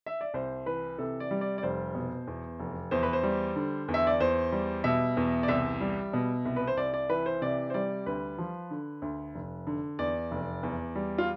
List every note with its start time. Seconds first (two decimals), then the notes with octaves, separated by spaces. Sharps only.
0.06 E5
0.21 D5
0.34 C2 C5
0.66 E3 B4
0.98 C3 A4
1.20 D5
1.31 G3
1.41 D5
1.58 D5
1.63 F1 C5
1.94 B2
2.27 E2
2.59 F1
2.91 E2 C5
3.03 B4
3.13 C5
3.23 G3
3.56 D3
3.88 E2
3.94 E5
4.07 D5
4.20 E2 C5
4.52 G3
4.84 B2 E5
5.17 E2
5.43 D5
5.48 C2 E5
5.81 G3
6.13 B2
6.45 C2
6.56 B4
6.67 C5
6.77 C2 D5
6.94 D5
7.09 E3 B4
7.26 C5
7.42 C3 D5
7.70 C5
7.74 G3 D5
8.06 D2 B4
8.38 F3
8.71 D3
9.02 D2
9.35 F1
9.67 D3
9.99 E2 D5
10.31 F1
10.63 E2
10.96 G3
11.18 F4